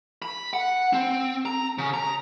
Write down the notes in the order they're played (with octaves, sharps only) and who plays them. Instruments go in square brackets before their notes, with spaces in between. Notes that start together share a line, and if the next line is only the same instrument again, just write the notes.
[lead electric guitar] B5
F#5
C4
A#5
C#3
A#5